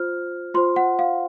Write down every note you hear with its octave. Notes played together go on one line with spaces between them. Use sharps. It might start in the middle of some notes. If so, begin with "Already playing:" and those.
Already playing: F4 C5 F6
F4 C5 C6
F#5
F5